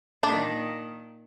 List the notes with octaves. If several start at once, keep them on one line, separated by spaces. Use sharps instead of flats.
A#2 D#3 D4